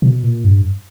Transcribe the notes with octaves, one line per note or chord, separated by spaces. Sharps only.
B2
A#2
G2